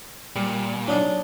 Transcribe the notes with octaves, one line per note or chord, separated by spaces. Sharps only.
A#2 G3
F#3 D4 D#4